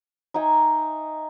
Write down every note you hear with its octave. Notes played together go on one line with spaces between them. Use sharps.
D#4 E5 G5 G#5